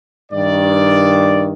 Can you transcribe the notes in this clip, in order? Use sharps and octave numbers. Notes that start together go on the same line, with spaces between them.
G2 D#3 D5